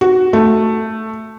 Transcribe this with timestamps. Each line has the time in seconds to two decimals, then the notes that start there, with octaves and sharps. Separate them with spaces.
0.01 F#4
0.33 A3